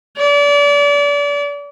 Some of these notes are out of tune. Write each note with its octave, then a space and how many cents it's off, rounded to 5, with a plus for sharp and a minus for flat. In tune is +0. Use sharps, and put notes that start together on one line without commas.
D5 -35